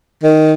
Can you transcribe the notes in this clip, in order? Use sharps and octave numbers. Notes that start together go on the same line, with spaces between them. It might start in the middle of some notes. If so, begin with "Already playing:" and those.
D#3